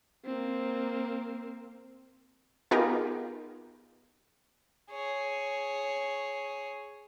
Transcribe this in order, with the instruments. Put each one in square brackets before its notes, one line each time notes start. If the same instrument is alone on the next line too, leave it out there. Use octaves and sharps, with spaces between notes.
[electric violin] A#3 C4
[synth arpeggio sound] B3 D#4 F4 G4 G#4 A#4
[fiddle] G#4 C#5